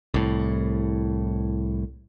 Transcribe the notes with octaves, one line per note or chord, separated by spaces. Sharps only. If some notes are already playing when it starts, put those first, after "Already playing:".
C2 A2